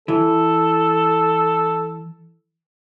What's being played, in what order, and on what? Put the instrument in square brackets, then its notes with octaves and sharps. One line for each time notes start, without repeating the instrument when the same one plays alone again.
[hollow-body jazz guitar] E3 [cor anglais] A4